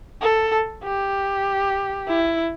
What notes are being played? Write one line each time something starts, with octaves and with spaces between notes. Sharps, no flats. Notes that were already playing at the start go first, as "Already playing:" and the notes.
A4
G4
E4